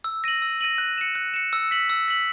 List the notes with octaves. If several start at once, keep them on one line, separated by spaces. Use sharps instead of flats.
E6
A#6 D#7 F#7
E6
A#6 D#7 F#7
F#6
C#7 E7
F#6
C#7 E7
E6
B6 F#7
E6
B6 F#7